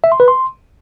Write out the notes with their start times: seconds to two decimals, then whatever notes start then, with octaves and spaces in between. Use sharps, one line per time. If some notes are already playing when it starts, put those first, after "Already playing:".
0.04 E5
0.12 C6
0.20 B4
0.28 C6